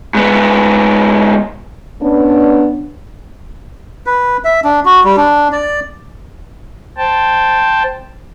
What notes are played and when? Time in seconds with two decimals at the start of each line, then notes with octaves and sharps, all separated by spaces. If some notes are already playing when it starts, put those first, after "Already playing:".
0.15 G#2 B3
2.02 B3 C#4 D4
4.06 B4
4.44 E5
4.64 D4
4.85 F#4
5.04 G3
5.17 D4
5.52 D5
6.98 C5 G5 A5